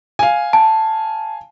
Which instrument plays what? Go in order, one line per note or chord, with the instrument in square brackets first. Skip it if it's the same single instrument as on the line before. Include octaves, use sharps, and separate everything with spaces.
[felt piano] F5 G#5
[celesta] A5